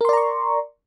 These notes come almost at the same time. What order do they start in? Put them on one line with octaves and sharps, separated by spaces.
A#4 C6 D5 A#5 C#6